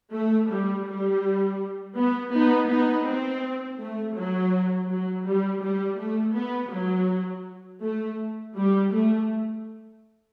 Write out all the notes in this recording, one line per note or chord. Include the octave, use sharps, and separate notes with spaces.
A3
G3
G3
B3
B3 D#4
B3 D#4
C4
A3
F#3
F#3
G3
G3
A3
B3
F#3
A3
G3
A3